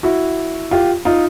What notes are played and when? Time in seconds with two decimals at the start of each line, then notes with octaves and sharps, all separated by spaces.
0.03 E4 F#4
0.71 F4 G4
1.05 D#4 F4